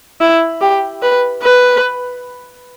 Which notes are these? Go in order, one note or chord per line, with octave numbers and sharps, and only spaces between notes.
E4
G4
B4
B4